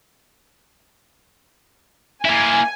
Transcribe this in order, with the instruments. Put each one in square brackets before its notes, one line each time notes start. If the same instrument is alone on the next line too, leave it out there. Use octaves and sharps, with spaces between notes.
[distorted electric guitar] A#3 E4 [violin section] G#5